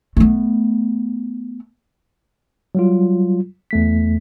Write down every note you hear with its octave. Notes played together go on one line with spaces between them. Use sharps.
A3 B3
F#3 G3 F4
E2 A3 B6